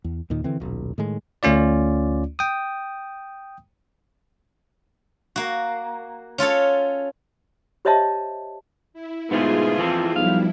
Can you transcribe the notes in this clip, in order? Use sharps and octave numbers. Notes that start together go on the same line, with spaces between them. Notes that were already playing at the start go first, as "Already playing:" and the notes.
E2
D#2 A#2 D#3
D3 E3 C4
D#1 B1
A2 D#3 G#3
D2 A3 C#4 F4 D5
G5 D#6
A#3 F#4
C#4 F4 A4 C#5
G4 C5 C#5 D#5 E5 A5
E4
G#2 B2 A3 B3 F4 G#4
F2 E3 C4 A4
B1 F3 G3 E4 F5